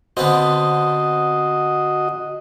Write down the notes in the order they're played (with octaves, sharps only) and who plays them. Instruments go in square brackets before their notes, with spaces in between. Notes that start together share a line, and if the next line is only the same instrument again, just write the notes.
[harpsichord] D3 B3 C4 [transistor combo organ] F#4 D#5